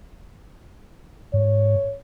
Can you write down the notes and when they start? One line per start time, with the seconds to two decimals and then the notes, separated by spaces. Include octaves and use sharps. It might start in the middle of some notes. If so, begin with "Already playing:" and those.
1.34 G#2 C#5